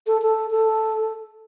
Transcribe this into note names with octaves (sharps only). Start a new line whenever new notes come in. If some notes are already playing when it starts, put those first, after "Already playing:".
A4
A4
A4